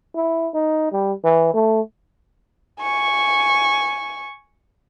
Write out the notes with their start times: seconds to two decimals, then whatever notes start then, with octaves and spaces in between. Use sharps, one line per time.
0.15 E4
0.54 D#4
0.92 G3
1.24 E3
1.54 A3
2.80 G#5 C#6